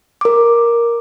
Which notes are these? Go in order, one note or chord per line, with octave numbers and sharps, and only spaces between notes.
A#4 D6